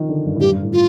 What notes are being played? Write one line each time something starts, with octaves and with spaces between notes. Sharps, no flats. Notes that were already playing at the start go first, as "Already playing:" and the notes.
Already playing: D#3 F3
D3
G2
A2
G2 G4
G2
A2
F4